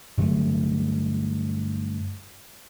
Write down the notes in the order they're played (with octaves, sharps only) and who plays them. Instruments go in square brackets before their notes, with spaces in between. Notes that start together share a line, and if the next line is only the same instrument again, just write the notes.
[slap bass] G2 D3 F#3 A3